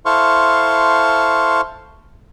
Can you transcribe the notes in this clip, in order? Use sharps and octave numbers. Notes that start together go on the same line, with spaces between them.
E4 A4 C5 F5 C6 C#6